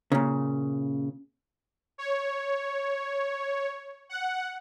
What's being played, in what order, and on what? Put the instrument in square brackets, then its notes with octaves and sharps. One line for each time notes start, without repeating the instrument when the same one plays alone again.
[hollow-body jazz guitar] A#2 C#3
[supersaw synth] C#5
F#5